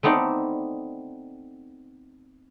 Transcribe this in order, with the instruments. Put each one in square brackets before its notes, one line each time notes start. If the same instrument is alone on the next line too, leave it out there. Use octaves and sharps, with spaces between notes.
[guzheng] A3 B3 C4 D#4 D5